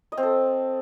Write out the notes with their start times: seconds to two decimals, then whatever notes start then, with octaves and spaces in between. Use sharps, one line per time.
0.12 D#5
0.17 C4
0.23 A4